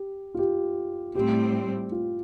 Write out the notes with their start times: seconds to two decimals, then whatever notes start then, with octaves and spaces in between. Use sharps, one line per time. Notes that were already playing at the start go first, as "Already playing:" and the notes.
Already playing: G4
0.35 F4
0.39 G4
1.15 A2 G3 C4 G4
1.92 F4